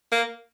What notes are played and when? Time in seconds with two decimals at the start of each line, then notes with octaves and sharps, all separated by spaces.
0.12 A#3